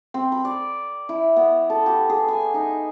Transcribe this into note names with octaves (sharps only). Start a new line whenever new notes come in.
C4
B5
D5
E4
B3
A4
G4
G#4
G#5
D#4